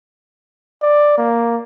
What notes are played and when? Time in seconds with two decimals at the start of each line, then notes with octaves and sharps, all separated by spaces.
0.82 D5
1.18 A#3